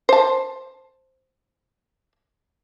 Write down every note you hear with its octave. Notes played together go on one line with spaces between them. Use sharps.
C5 A5